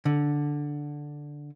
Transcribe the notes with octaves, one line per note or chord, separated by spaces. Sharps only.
D3